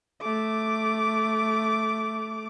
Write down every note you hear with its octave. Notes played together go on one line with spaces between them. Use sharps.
A3 D6